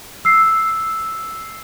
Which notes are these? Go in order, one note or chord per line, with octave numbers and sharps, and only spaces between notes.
E6 C7